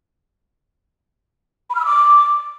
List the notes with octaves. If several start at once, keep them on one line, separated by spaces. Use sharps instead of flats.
B5
F6
E6
D6